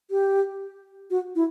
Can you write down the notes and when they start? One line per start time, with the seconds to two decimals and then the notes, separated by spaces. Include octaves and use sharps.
0.11 G4
1.10 F#4
1.36 E4